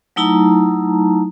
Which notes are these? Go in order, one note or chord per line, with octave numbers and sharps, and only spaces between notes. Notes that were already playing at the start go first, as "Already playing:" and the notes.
F#3 A3 D#4 E4 A5 A#5